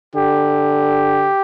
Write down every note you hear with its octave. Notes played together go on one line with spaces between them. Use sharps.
D3 G4